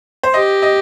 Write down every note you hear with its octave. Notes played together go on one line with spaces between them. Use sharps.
C5
G4 D#5
D#5